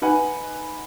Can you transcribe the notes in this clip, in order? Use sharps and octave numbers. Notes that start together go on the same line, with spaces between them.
D#4 B4 F#5 G#5